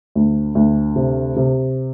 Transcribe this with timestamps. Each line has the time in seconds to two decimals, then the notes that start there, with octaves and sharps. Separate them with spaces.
0.15 D2
0.55 D2
0.96 C3
1.36 C3